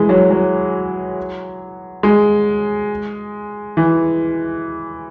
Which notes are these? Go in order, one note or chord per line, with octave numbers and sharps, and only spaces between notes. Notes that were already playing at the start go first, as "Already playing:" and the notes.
Already playing: E3 G#3
F#3
F#3
G#3
E3